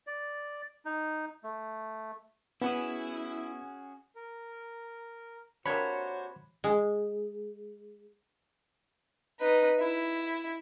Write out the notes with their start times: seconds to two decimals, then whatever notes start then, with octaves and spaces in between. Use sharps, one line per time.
0.07 D5
0.85 D#4
1.44 A3
2.62 B3 C#4 E4 F#4 G#4
4.16 A#4
5.66 C3 A#3 D4 F#4 C5 C#5 B5 G#6
6.64 G#3
9.39 D#4 B4
9.80 E4